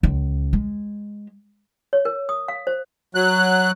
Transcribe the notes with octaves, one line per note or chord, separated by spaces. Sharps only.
C#2
G#3
C#5
A#4
D#6
F5
C5
F#3 F#6